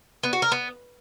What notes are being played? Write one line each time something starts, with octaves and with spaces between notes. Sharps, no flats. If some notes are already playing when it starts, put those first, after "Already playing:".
B3
F#4
A#4
B3